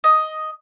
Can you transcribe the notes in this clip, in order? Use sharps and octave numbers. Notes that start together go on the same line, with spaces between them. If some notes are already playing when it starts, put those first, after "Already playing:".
D#5